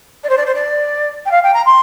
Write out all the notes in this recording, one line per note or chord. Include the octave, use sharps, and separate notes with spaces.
D5
C5
D5
C5
D5
G5
F5
G5
A#5
C6